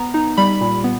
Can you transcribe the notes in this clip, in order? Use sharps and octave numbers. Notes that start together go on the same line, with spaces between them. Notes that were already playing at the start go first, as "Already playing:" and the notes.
Already playing: B3 A#5
D#4
G3 B5
A#2
B3